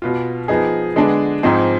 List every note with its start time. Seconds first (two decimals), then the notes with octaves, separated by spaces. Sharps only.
0.02 B2 B3 F4
0.48 F3 B3 D#4 G#4
0.96 D3 G#3 B3 D4 G#4
1.43 G#2 F3 C4 D#4 G#4